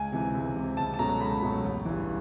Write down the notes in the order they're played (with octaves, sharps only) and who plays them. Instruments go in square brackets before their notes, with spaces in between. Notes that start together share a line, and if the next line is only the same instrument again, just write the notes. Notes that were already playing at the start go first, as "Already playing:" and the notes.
Already playing: [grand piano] C#2 G#5
C3 E3
C#2
C3 E3
C#2 A5
A5
B2 F#3 A3 C#4 A#5
A#5
C#2 B5
B2 F#3 A3 C#4
A1
G2 E3